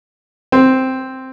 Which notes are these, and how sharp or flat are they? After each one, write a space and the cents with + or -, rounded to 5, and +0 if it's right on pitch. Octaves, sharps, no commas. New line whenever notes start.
C4 +0